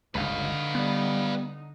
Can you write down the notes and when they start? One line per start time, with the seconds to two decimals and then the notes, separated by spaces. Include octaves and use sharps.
0.15 G1 C#2 D3 D#4 B4 F5
0.75 G3 B3